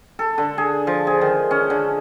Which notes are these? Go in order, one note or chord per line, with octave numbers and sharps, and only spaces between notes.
A4
D3
G#4
F3
G#4
D#3
C#4
D3